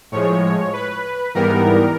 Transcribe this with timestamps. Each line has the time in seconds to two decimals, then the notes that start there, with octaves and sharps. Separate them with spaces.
0.12 A2 F3 G#3 C#5
0.73 B4
1.35 G#2 E3 G3 B3 A#4